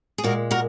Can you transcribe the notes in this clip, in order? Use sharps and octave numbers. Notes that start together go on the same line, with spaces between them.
G#4
A#2 G#3 F#4 A#4
F#4 A#4